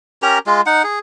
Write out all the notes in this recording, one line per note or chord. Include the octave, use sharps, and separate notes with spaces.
C#4 G4 A#4 A#5
G#3 F4
D#4 F#5
G#4